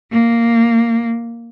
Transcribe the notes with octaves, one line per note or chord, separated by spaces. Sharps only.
A#3